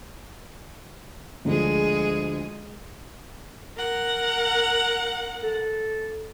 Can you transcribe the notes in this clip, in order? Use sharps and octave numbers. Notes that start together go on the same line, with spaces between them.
D2 D3 F3 G#3 G#4
A#4 F#5
A4